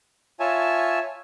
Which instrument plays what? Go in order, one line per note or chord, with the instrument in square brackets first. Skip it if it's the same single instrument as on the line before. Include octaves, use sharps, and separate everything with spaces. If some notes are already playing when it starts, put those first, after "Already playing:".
[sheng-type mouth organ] F4 C#5 E5 G#5 A5